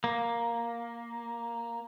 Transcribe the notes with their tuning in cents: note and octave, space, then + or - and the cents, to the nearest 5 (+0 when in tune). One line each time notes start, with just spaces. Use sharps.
A#3 +5